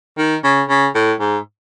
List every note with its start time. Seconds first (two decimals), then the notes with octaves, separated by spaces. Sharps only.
0.18 D#3
0.44 C#3
0.69 C#3
0.95 A2
1.20 G#2